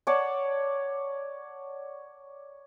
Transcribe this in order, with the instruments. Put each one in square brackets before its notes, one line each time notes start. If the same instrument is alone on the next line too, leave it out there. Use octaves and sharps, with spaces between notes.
[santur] C#5 D5 F#5 A5